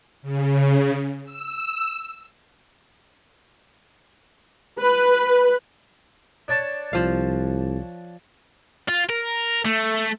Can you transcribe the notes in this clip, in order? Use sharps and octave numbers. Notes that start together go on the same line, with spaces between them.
C#3
E6
B4
D4 C#5 A5
C2 F3 F5
F4
A#4
A3